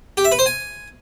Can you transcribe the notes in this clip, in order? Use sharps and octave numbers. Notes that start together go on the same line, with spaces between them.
G4
E5
B4
C5
G#5